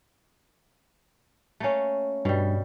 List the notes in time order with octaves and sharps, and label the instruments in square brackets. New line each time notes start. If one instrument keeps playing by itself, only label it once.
[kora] A3 A#3 C#4
[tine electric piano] G2 [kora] B2 G3